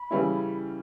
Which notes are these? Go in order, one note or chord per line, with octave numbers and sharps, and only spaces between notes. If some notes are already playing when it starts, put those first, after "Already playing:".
Already playing: B5
C#3 E3 G3 C#4 E4